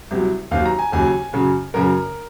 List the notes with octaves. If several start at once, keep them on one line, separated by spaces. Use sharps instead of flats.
C2 C3 F#3
D#2 D#3 F#3 F5
A#5
G#5
D#2 C#3 F#3 G#5
F#2 C#3 F#3
F#2 C#3 F#3 A#4